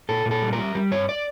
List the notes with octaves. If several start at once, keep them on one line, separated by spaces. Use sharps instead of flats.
A#2 A4
A#2
A4
G3
A#4
G3
G3
G2 C#5
D5